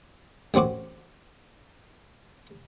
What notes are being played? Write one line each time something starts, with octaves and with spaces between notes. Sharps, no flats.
A1 F#2 C4 F#4 D6